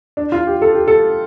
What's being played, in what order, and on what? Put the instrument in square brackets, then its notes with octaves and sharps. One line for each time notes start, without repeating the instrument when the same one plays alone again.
[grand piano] D4
F4
G4
A4
G4
A4